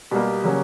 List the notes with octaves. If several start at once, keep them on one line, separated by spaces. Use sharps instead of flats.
B2 G3 A#3 G4
C#3 F#3 A#3 C#4